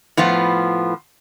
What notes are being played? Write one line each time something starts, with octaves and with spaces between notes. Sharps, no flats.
A2 F3 B3 F4